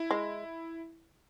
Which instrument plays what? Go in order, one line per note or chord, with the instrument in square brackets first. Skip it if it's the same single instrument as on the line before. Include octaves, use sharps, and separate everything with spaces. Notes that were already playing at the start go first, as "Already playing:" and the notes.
Already playing: [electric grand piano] E4
[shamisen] G#3